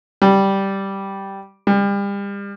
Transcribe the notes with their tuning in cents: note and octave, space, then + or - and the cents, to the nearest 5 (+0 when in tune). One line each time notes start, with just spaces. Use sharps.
G3 -5
G3 +35